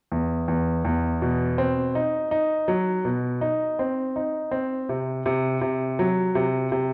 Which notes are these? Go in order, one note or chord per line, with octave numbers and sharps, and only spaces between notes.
E2
E2
E2
B2
C4
D#4
D#4
F#3
B2
D#4
C4
D#4
C4
C3
C3
C3
F#3
C3
C3